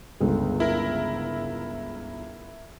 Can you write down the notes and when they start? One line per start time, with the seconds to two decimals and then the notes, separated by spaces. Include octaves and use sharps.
0.20 G1 C#2
0.60 E4 A#4